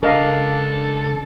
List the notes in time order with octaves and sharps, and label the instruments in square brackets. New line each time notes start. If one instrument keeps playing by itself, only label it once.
[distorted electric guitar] C#3 G#3 [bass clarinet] D4 [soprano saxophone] A4 [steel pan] A#4 D#5 F5